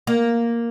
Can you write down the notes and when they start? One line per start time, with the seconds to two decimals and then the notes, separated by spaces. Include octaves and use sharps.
0.07 A#3